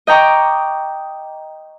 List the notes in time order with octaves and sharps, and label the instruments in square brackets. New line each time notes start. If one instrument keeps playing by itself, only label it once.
[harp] D#5 G5 A#5 C#6 D6